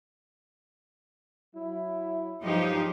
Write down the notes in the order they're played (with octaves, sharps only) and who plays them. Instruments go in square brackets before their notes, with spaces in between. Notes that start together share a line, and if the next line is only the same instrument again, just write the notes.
[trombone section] F#3 E4
[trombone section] G2 F#3 G#3 [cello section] F3 D#4 G4